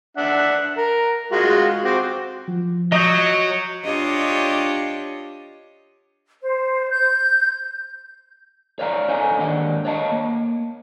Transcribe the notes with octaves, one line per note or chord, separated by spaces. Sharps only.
D4 E5 F#5
A#4
G#3 F4 F#4
C4 F#4 D6
F3
F#3 D#5 D#6 G6
D4 F4 G4 C#5 D#5
C5
G6
C#5 D5 F5 G#5 A#5
C#4 D#4 A4 C#5 D#5 G#5
D#2 G#2 D3 G3 F#5
C#5 D#5 F5 A5
A#3